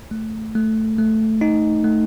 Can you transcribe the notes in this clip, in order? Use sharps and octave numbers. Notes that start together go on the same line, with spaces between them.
A3
A3
A3
D#4
A3